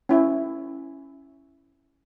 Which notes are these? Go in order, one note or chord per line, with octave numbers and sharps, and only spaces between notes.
C#4 E4